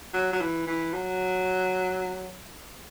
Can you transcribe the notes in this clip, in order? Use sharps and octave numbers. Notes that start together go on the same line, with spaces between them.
F#3
F#3
E3
E3
F#3